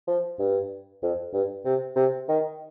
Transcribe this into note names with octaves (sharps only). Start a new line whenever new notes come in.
F3
G2
F2
G2
C3
C3
D#3